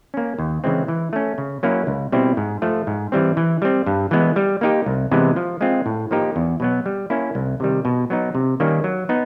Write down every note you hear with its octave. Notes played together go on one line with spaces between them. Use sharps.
A#3 C#4
D#2
C#3 E3 G#3 C4
E3
A3 C#4
C#3
F#3 A#3 C#4 E4
C#2
B2 G3 C4 E4
G#2
F3 A3
G#2
E3 G3 C4
E3
G3 C4
G2
E3 G#3 B3
G3
A#3 D#4 G4
C2
C3 E3 G#3 B3
F3
G#3 C4 F4
A2
F3 A#3 D#4 G4
E2
B2 F#3 B3
G3
A#3 C#4 E4
C2
C3 D#3 G3
B2
F#3 B3 D#4
C3
D#3 G3 A#3 C#4
F#3
B3 D#4